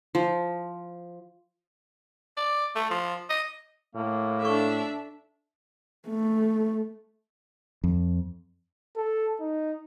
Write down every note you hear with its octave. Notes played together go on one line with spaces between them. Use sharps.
F3
D5
A3
F3
D#5
A2 A#3
D4 A4 E5 C#6
A3
F2
A4
D#4